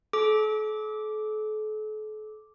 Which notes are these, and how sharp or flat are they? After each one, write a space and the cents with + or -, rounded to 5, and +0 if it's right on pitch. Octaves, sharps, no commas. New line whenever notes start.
A4 -40 D6 +0